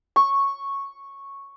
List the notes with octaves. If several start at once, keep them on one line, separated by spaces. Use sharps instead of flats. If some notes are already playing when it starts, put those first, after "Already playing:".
C#6